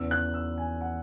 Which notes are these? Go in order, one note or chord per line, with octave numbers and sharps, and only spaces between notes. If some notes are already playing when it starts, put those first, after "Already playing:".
Already playing: E2 C#3 E3 E6
F#6
E6
G#5
F#5